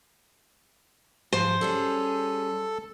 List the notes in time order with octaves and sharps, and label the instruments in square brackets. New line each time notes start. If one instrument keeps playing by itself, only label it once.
[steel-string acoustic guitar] G#2 F3 [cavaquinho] C5
[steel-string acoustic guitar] G3 C#4 G#4 [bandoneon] A4